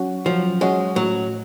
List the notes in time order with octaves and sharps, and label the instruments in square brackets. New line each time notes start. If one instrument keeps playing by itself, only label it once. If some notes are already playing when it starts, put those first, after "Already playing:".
Already playing: [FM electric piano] F#3 C#4 F#4
[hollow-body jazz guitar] F3 [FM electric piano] F#3
[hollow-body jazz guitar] G#3 [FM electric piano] C#4 F#4
[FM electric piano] A2 [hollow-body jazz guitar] F#3